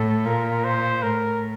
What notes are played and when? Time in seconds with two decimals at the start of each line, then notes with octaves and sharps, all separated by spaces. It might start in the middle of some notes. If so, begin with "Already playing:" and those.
Already playing: A2 A4
0.25 A#2 A#4
0.64 C5
1.02 A2 A#4